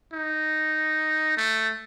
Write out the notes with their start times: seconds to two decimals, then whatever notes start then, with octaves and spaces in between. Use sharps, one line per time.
0.13 D#4
1.38 A3